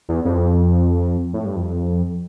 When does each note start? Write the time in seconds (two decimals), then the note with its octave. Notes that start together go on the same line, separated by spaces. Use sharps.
0.09 E2
0.25 F2
1.33 A2
1.45 G2
1.56 F2